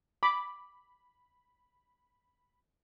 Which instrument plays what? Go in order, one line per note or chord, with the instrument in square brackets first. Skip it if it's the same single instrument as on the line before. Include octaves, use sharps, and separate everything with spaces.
[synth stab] B5 [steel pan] D6